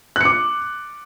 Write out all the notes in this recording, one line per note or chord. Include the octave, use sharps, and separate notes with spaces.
D6 F#6 C#7